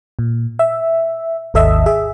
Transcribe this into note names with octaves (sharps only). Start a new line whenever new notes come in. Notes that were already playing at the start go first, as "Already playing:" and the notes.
A#2
E5
G#1 D#2 A4 D#5 E5
G#4 E5